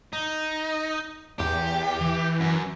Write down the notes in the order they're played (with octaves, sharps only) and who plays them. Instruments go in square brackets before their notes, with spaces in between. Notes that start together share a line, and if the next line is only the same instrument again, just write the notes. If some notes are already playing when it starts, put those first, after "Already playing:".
[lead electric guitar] D#4
[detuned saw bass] E2 [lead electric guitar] G4
[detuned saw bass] E3
[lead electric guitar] F#2